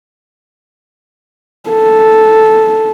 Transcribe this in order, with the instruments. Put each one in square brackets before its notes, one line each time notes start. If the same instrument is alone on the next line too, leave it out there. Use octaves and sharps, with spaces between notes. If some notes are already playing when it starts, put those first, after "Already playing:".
[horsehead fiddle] A4